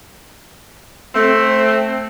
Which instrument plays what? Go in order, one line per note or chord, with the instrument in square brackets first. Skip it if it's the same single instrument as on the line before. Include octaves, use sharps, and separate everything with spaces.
[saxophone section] A3 C4